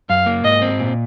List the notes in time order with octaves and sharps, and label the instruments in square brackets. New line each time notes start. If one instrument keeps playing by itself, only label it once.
[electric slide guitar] F#2 [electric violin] F5
[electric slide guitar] A#3
[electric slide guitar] G#2 [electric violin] D#5
[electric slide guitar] C4
A#2